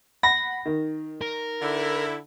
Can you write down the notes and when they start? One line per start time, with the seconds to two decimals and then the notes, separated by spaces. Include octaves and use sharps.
0.23 F#5 B5 A#6
0.66 D#3
1.21 A#4
1.62 D3 E4